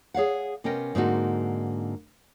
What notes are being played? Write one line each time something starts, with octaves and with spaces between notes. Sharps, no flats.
G#4 C#5 F5 F#5
C3 B3 C#4 A#4 D#5 G5
G#2 D3 A#3 C4 D#4 F#4